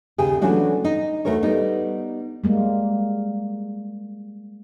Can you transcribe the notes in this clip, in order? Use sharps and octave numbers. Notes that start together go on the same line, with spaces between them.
D#2 C#3 G4 G#4
E3 F#3 A3 C#4 D4 F#4
D#4
E2 A3 F#4 A#4 C#5
G3 B3 D#4
G3 G#3 A#3